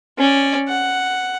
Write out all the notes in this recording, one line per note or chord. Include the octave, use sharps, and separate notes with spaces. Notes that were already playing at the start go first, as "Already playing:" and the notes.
C#4 D5
F#5